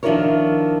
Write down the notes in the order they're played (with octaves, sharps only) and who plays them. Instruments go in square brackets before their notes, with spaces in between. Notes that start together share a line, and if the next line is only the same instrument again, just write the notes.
[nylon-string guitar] D#3 F3 D4 E4 A#4 C#5